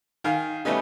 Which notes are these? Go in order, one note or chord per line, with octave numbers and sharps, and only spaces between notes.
D#3 F5 G#5
G3 A3 B3 C#4 D#4